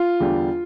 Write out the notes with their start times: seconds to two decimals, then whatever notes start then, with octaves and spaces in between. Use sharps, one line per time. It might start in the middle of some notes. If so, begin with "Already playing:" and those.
Already playing: F4
0.20 E2 D3 G3